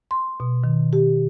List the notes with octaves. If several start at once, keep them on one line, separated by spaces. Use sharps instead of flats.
C6
B2
D#3
G4